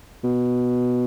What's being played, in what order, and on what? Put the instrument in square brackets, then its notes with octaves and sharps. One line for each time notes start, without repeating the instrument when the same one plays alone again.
[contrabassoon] B2